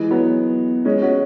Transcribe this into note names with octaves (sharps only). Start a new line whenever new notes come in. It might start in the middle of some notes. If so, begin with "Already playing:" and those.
Already playing: E3 G#3
F#3 B3
G#3 C#4
C#4 F#4